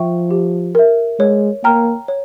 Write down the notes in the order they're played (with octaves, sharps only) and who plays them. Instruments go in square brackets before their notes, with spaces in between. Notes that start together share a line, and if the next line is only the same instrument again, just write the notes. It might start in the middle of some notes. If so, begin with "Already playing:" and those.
Already playing: [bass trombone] F3 [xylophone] E5 G5 C#6
[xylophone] G4
A#4 E5
[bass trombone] G#3 [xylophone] C#5
[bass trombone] A#3 [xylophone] G5 A#5 F6
[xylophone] C#5